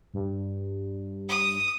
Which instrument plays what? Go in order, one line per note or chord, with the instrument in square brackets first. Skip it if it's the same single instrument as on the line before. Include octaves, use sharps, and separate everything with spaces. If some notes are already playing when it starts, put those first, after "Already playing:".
[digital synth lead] G2
[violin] D#6